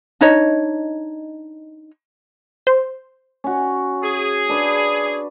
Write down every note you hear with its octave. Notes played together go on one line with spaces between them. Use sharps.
D4 D#4 C#5 D#5
C5
C#4 F#4
G#4
D4 B4